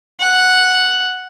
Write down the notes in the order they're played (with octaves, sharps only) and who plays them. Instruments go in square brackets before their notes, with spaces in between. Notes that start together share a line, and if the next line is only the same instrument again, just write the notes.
[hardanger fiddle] F#5